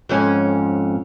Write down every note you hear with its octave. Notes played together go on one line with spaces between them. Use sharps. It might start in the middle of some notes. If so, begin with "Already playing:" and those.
F2 G#2 C#4